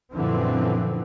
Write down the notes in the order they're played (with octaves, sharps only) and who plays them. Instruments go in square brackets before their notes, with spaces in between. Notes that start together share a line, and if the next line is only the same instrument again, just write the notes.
[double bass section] F#2 A#2 D3 E3 F3 C4